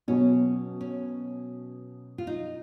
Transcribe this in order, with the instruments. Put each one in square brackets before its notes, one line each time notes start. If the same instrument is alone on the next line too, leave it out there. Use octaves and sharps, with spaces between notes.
[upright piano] B2 F#3 B3 [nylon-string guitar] C#4
[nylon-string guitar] C#4
F4
D#4